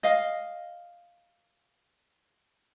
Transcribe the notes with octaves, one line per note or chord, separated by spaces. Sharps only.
D#5 F5